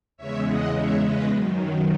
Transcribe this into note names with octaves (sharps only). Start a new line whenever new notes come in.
E2 C#3 G#3 C#5 E5
D#5 F#5
C#5 E5
B4 D#5
F#2 D#3 F#3